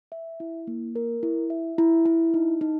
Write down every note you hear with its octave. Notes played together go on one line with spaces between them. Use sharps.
E5
E4
A#3
A#4
E4
E5
E4
E4
D#4
D#4